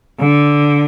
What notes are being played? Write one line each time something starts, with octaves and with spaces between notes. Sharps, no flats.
D3